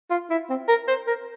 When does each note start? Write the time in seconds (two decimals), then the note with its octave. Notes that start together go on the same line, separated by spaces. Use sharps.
0.10 F4
0.30 E4
0.49 C4
0.68 A#4
0.88 C5
1.07 A#4